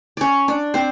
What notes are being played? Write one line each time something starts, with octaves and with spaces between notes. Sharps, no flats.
C#4 C#5 D5
D4 D5
C4 C5